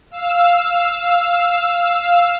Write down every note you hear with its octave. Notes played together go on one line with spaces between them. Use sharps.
F5 E6